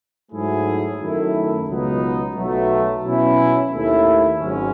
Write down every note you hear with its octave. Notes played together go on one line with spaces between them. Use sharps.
G#2 F#3 A3 E4 G#4
F#2 D#3 A3 E4
C#2 B2 F#3 B3 D#4
B1 B2 F#3 A3
B2 F#3 C#4 E4
D#2 D#3 A3 E4
G#1 G#2 F#3 C#4